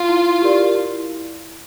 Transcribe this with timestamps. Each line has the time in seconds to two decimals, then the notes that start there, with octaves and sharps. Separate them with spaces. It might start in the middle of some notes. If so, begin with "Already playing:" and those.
Already playing: F4
0.09 E4
0.42 G4 A#4 D5
0.75 E4